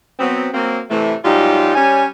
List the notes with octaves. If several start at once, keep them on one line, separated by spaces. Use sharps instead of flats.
F#3 B3 C4
F#3 A#3 C4
A2 C3 E3 A3
G#2 F#3 G3 D#4 F4 G4
G3 C#4 G#5